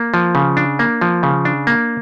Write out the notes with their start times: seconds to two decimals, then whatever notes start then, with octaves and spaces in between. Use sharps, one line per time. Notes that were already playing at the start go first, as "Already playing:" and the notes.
Already playing: A#3
0.14 F3
0.35 C#3
0.57 D4
0.79 A#3
1.01 F3
1.23 C#3
1.45 D4
1.67 A#3